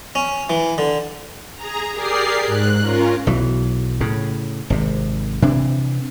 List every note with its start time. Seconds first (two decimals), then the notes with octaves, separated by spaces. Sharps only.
0.15 C#4
0.50 E3
0.78 D3
1.55 G#4 A#5
1.92 G4 G#4 A#4 D5 C7
2.46 G#2 F#6
2.80 C#4 F4 A#4
3.27 B1 E3 F#3
4.01 A2 C#3
4.70 G#1 C3
5.42 C3 E3 D4